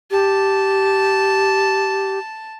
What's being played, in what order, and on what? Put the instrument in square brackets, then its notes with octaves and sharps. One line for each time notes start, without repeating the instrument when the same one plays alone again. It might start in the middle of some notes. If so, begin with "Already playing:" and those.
[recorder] G4 [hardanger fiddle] A5